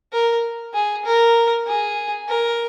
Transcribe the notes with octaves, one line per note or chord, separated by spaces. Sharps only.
A#4
G#4
A#4
G#4
A#4